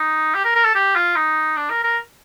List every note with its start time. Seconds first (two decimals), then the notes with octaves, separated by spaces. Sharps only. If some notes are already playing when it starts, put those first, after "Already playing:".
Already playing: D#4
0.35 G4
0.44 A#4
0.55 A#4
0.65 A4
0.75 G4
0.95 F4
1.16 D#4
1.56 D4
1.70 A#4
1.83 A#4